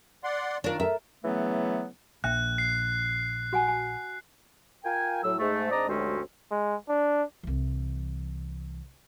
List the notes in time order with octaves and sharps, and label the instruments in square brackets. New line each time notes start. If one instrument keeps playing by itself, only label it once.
[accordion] D5 F#5 C6
[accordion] D#3 [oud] D4 A#4 [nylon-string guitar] F4 C#5
[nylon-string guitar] A4 A#4 [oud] E5
[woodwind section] C#3 E3 F#3 A3 B3
[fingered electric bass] A#1 [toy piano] E5 G5 [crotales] F#6
[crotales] C7
[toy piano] F#4 F#5 G#5
G#5 A5
[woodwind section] F4 A#4 F5 G5 G#5
A2 F#3 E6
G#2 A3
G#2 C4 D4 D5 D#5 A#5
D2 G2 F#3 G#3 C4 C#4
[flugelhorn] G#3
D4
[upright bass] C2 E3